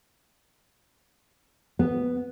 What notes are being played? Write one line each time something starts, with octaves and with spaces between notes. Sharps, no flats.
B3